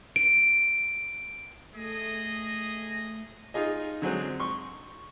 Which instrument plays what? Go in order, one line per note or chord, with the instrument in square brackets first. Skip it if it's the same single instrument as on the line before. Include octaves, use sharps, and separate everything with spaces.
[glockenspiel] D7
[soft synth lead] A3 [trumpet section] G#4 D#5
[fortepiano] D#4 F4 G#4 D#5
D3 F#3 G#3 C4
C6 C#6